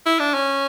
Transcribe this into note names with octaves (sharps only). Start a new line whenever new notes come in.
E4
D4
C#4